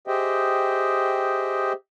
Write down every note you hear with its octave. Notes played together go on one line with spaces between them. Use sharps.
G4 G#4 C5 D#5 E5 G5